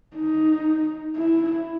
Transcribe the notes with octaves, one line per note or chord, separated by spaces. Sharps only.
D#4
E4